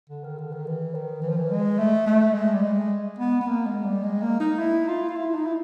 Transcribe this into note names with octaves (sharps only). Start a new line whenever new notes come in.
D3
D#3
D3
D#3
E3
D#3
E3
F3
E3
G#3
A3
A3
G#3
G3
G#3
B3
B3
A#3
G#3
G3
G#3
A#3
D#4
E4
F4
F4
E4
D#4
E4